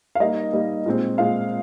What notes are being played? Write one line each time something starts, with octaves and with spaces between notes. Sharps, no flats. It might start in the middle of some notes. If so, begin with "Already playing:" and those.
F5
G3 A#3 D#4 D#5
G3 A#3 D#4
A#2 G#3 C4
A#2 G#3 C4 F5